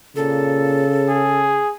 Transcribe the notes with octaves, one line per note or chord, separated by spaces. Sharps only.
A#2 C#3 A4
G#4